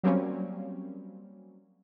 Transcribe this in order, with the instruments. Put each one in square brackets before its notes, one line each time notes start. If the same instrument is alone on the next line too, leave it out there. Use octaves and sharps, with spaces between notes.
[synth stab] F#3 G3 A#3 C4 C#4